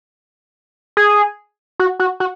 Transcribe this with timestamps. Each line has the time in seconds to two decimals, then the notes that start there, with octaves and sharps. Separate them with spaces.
0.97 G#4
1.80 F#4
2.00 F#4
2.20 F#4